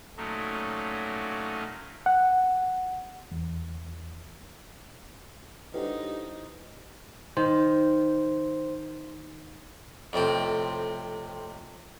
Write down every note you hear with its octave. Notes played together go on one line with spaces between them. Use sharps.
A#2 F#3 A3 A#3 C#4 D#4
F#5
E2
G2 D3 F#3 D#4 E4 G4 B4 C5
D#3 C5
F2 A2 C3 C4